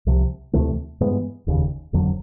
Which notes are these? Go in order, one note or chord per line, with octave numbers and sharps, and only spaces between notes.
C2 C3 F3
D2 C3 E3 A3
G2 E3 G#3 B3
F1 D#2 C#3
F#1 F2 D3 F#3